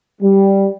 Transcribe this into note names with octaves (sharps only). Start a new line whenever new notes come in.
G3